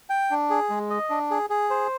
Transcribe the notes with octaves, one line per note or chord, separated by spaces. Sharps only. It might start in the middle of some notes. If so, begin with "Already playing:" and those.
G5
D4
G#4
G#3
D#5
D4
G#4
G#4
C5